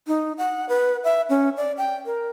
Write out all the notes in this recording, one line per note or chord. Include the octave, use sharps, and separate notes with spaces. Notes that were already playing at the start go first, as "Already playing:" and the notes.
D#4
F#5
B4
E5
C#4
D5
G5
A#4